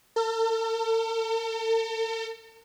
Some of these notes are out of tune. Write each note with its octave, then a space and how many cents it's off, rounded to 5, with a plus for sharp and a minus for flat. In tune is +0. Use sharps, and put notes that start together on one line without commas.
A4 +45